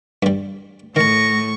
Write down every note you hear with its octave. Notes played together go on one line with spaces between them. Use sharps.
G2 G3
A2 D#3 A5 C#6 A#6